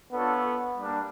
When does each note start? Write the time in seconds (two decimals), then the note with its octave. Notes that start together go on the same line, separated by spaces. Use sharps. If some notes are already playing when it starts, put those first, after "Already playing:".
0.12 B3 D4 F4 A4 C#5
0.77 G3 A#3 D4